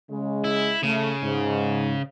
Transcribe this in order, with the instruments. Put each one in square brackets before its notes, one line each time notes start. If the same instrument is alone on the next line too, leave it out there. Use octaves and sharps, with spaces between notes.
[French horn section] C#3 G#3
[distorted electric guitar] E4
[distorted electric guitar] C#3 [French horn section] A3
[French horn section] G#2